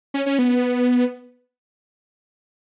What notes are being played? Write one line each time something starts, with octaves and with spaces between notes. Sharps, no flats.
C#4
C#4
B3